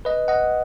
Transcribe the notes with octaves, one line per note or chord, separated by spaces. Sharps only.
B4 D#5
D#5 F#5